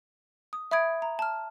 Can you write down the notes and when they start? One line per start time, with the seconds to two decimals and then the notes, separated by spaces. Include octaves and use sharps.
0.53 D#6
0.71 E5 B5 D#6 G#6 D7
1.02 A#5
1.19 A5 F6